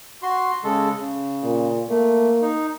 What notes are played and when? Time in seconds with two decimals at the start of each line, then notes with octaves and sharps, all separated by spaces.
0.23 F#4 C6
0.64 C#3 G#3 A4
0.98 C#3
1.43 A#2
1.89 A3 A#3
2.42 D#4